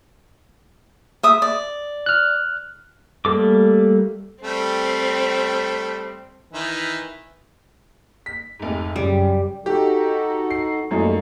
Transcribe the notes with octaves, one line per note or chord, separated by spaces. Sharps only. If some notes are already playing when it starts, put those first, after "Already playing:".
E5 D#6
D5
F6 F#6
G3 A3 A#3 A4 D6
G3 A3 C4
D#3 E3 E5
B6
F1 G#2
F#2 C#3 G3
D#4 F#4 G4 A4
C7
F#2 G3 A3 A#3 D#4